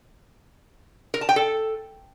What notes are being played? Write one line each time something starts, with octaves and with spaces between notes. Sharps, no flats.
A#4
A5
G5
A4